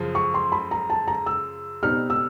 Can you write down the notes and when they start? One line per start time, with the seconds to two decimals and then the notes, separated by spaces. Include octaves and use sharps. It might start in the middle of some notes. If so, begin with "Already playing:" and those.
Already playing: F#2 C#3 F3
0.15 C#6
0.34 C6
0.52 B5
0.71 A#5
0.90 A5
1.08 A#5
1.26 E6
1.83 B2 G3 C4 D#4 F6
2.10 E6